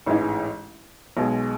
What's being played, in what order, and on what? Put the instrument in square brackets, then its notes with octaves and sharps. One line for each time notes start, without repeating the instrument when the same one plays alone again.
[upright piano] A1 G#2 E3 G#3 D#4
B1 B2 G#3